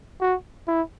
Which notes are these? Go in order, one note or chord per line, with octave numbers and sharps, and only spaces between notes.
F#4
E4